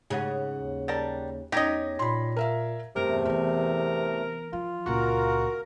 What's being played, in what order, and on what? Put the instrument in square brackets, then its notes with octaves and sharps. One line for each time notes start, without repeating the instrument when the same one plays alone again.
[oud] G#2 C#3 G#4 [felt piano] F#5
[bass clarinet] D#2
[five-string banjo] G3 A#4 A5
[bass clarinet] E2 [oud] C#4 D#4 [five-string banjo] G4 D#5 [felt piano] G#6 A#6
[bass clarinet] A#2 [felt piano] B5 C6
[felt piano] A#4 E5 F5
[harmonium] E2 A3 [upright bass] G2 [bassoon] C3 [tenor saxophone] A#4
[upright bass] E3 B3 [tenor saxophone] A#4
[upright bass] F3 [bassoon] F4
[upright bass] C#2 A#2 [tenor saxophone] F#4 [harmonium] A#4